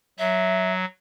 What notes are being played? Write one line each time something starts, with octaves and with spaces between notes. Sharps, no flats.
F#3 E5